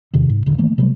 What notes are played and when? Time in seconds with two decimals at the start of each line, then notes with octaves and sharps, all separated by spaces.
0.14 E2 C3 D#3
0.29 G#2
0.46 D#1 D3
0.58 D#3 E3 A3 A#3
0.78 C3 F#3 G3 A3